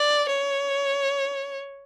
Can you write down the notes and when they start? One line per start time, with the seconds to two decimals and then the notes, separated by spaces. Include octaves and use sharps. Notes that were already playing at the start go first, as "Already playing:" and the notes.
Already playing: D5
0.29 C#5